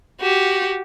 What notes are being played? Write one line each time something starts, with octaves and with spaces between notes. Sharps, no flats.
F#4 G4